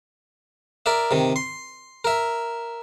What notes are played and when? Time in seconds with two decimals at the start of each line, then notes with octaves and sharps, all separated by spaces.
0.86 A#4 D5 E5
1.11 C3 D#3
1.36 C6
2.05 A#4 E5